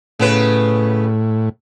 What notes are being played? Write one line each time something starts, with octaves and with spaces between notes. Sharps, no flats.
A2 C#3 B3 B4